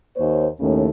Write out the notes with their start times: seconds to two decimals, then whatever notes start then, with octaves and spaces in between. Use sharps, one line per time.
0.17 D#2 A#3 D#4 C5 C#5
0.60 D#2 A2 C#3